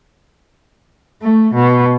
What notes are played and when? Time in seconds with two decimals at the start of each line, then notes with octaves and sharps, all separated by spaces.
1.22 A3
1.54 B2